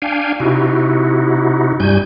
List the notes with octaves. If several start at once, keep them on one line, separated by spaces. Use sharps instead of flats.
D4 F5 G5 G#5
C3 D#4 E4 F#4
G2 G3 G#5 G6